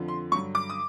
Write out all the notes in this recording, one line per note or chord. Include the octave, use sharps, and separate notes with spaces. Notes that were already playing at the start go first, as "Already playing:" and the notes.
Already playing: F2 D3 F3
C6
G2 D3 F#3 C#6
D6
D#6